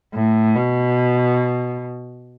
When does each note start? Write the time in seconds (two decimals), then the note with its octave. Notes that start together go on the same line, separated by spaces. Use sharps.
0.14 A2
0.55 B2